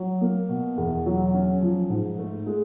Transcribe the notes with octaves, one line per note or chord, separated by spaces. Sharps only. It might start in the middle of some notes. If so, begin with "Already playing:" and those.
Already playing: F#3
A#3
B2
E2
F#3
C#4
F3
G#2
A3
G#3